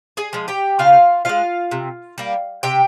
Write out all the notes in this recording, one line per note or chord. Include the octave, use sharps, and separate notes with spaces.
G#4 G#5
F3 G#3
G4 G5
C#3 F4 F5
F3 G#3 F4 F5
C3
G3 A#3
C3 G4 G5